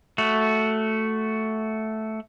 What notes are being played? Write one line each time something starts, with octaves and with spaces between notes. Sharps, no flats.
A3 F#4